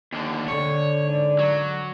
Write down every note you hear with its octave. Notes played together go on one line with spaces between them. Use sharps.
D#2 D3
D3 C#5
G#2 D5
F#3